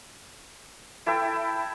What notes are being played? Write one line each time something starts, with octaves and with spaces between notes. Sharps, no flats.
E4 A4 E5 G5